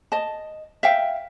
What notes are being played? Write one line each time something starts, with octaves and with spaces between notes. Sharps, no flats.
D#5 A5
E5 F5 G5